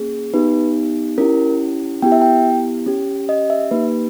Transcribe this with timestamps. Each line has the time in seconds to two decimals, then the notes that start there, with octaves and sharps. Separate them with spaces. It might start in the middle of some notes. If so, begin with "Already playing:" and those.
Already playing: A#3 C#4 G#4
0.34 B3 D#4 G4 B4
1.18 C#4 E4 G4 A#4
2.02 B3 E4 G4 G5
2.12 E5
2.22 G5
2.86 C#4 G4
3.29 D#5
3.50 E5
3.71 A#3 D#4 G4 B4